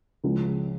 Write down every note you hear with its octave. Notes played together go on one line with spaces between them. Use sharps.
C#2 C#3 F3